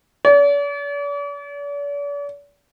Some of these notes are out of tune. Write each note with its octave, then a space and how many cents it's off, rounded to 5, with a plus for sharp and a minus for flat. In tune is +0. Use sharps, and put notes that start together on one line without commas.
D5 -45